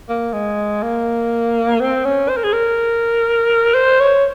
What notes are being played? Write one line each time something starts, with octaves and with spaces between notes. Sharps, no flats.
A#3
G#3
A#3
C4
C#4
C5
A#4
G#4
A#4
C5
C#5